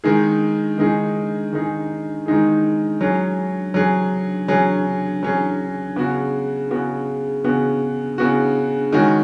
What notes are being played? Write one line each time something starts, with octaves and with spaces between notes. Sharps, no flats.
D#3 G#3 D#4 G#4
D#3 G#3 D#4 G#4
D#3 G#3 D#4 G#4
D#3 G#3 D#4 G#4
F#3 C#4 G#4
F#3 C#4 G#4
F#3 C#4 G#4
F#3 C#4 G#4
C#3 B3 F#4
C#3 B3 F#4
C#3 B3 F#4
C#3 B3 F#4
D#3 G#3 C#4 F#4